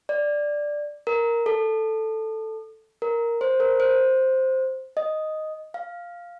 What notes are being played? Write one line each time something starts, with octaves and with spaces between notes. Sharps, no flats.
D5
A#4
A4
A#4
C5
A#4
C5
D#5
F5